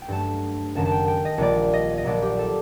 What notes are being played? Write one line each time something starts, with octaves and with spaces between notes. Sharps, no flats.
G5
G2 F#3 A3 A5
F#1 F#2 D#3 F#3 A5
A5
G5
G5
D#5
A#1 A#2 G3 A#3 D5
D#5
D#5
A#1 A#2 F#3 D5
G4
A4